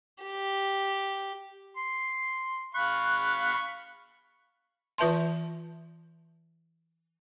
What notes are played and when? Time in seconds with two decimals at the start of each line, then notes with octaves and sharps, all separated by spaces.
0.24 G4
1.77 C6
2.75 F5 B5 C#6 F#6
4.98 E3 F4 B4 E5 A5 C6